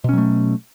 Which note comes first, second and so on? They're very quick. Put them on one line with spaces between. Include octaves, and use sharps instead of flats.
B2 C#4 F#3 A3